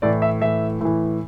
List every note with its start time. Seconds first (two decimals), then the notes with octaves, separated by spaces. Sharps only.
0.02 A2 E3 D5
0.22 E5
0.42 A2 E3 E5
0.81 A2 E3